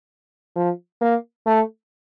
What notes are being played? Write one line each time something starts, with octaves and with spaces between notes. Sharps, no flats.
F3
A#3
A3